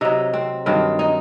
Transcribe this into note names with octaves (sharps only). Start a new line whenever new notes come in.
C3 F#3 D#4
C4
G2 D#3 F#3 C4
D#4